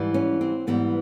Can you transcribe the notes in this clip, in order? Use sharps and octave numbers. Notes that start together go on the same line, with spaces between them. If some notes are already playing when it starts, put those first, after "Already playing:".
Already playing: G#2 E3 G3
C#4
C4
G#2 E3 G3 B3